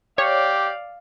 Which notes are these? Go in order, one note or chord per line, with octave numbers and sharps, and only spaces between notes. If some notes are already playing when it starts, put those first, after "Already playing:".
G4 C#5 D5 F5